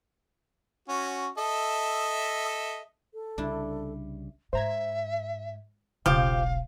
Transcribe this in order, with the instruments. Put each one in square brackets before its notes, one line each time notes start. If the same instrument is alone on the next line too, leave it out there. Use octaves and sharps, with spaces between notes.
[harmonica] C#4 F#4
A4 D#5 E5
[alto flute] A4
[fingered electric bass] C2 C#3 G3 [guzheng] D4 E4
[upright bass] G#2 [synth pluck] C5 A#5 G#6 [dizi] E5
[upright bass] E1 B1 [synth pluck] C#3 [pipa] F3 G4 [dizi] F5